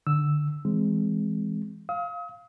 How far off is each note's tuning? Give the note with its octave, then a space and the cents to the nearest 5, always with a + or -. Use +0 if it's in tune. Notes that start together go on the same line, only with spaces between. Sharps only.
D3 +10 E6 +0
E3 +0 G#3 +0 C4 +0
F5 +0 D#6 +45